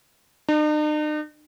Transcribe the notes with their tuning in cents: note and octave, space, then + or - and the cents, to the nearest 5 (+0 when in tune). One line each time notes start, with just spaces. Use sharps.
D#4 -45